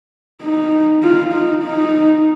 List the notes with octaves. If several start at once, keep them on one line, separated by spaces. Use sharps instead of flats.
D#4
F4
D#4
D#4